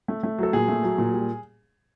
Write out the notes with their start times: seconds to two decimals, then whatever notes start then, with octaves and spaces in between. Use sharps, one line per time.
0.08 A3
0.23 A3
0.39 F#3 A4
0.53 A#2 G#4
0.68 A3
0.83 F#3
0.98 A#2
1.13 G3